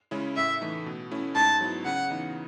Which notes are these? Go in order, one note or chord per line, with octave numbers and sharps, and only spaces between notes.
C#3 G#3 C#4 E4
A2 E5
E3 A3 D#4
B2
A3 C#4 E4
G#2 A5
F#3 B3 E4
C#3 F#5
E3 B3 D#4